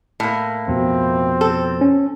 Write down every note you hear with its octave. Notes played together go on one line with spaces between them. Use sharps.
A2 A#3
F2 B2 C4
A4
C#4